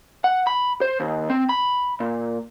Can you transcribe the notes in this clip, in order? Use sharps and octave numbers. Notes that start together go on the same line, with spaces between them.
F#5
B5
C5
D#2
C4
B5
A#2